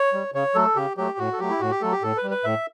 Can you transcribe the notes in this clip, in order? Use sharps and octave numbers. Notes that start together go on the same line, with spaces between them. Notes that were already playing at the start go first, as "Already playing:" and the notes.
Already playing: C#5
G3
C#3 C#5
F#3 A3 A4
C#3 G4
F#3 A3 G4
A2 F#4
A4
F#3 A3 G4
E4
A2 F#4
G4
F#3 A3 A4
G4
A2 A4
B4
G3
B4
A2 E5